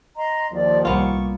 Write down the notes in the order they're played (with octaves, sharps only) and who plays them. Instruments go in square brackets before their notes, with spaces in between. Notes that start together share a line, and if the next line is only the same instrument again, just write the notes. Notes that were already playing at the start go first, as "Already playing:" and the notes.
[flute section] D#5 A#5 C6
[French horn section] D#2 F3 [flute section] D5
[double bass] C2 A#2 [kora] A#3 B3 F4 [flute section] C#6